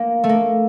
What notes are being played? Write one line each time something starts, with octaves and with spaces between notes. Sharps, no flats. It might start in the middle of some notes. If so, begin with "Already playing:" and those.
Already playing: A#3
A3
A#3